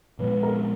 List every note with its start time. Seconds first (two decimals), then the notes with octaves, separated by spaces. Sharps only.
0.19 A#2 F3 G#3 B3 B4
0.43 A#4